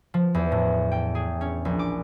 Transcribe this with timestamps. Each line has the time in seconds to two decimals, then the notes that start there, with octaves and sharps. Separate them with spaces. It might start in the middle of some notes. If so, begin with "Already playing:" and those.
0.14 F3
0.34 E2
0.52 A2
0.92 G5
1.15 G#4
1.41 C#4
1.65 A#1
1.79 D6